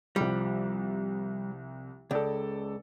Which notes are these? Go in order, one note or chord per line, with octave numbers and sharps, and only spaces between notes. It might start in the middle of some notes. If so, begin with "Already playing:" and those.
C2 F3 G3
C#2 A4 D5